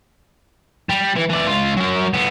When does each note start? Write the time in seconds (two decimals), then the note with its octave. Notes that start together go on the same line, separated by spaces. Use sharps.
0.90 G3
1.16 E3
1.30 E3 D5
1.47 C#2 F4
1.77 F#3 A#4
2.14 D3 B3